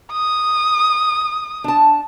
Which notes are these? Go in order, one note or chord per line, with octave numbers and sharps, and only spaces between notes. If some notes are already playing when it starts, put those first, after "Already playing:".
D#6
D4 A5